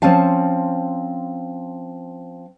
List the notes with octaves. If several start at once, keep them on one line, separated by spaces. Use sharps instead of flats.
F3 C4 C#4 F5 A5